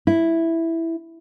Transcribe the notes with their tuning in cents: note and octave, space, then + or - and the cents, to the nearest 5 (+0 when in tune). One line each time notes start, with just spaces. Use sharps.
E4 +0